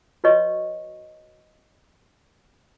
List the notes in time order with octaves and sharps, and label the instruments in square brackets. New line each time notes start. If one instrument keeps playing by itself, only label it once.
[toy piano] F#4 B4 C#5 D#5 C#6